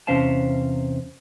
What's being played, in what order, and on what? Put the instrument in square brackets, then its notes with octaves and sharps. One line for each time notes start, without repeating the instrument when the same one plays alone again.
[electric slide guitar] E2 C3 C#4 C5 F5 A5